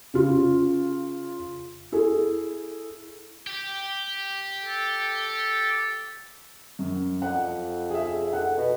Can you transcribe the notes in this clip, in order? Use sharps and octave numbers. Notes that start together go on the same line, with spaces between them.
C#3 F4
E4 G#4 A4
G4
A4
F#2
F2 F#5
G#4 E5
A4 F#5
B2